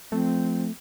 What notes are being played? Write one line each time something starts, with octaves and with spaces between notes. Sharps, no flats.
F3 A3 C4